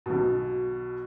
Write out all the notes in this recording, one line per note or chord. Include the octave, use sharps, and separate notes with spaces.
B1 B2